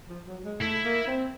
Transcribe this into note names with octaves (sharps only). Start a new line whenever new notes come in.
F3
F#3
G#3
A3 E4
A#3
C4